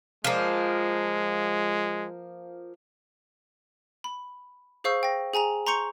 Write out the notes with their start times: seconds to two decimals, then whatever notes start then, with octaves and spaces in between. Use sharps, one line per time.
0.24 F3 G#3 A#3
4.04 B5
4.84 G#4 C5 F5 C#6 E6 G6
5.03 G5 A#6
5.34 G#4 G#5 A#5 F7
5.67 A#5 C6 C#6 G6 C#7 F7